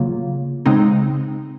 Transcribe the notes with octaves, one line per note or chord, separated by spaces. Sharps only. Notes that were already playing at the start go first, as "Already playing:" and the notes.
Already playing: C#3 F#3 A#3 F4
C#3 G#3 C4 D#4